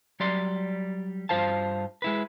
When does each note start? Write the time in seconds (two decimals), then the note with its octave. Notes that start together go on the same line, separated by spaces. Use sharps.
0.20 F#3 G3 D5 C6
1.29 G2 F4 C5 F5 A5
2.02 G#3 E4 B4